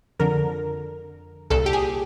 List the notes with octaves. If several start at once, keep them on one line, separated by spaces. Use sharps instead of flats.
F2 D3 A#4
C2 A#2 A4
G4
G#4